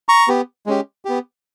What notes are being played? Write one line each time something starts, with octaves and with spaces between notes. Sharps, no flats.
A#5 C#6
B3 G4
G#3 C#4 G4
B3 G4